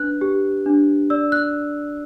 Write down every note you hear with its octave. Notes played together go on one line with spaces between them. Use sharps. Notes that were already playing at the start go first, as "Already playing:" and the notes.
Already playing: D4 B4 F#6
G4
D4
D5 E6
F#6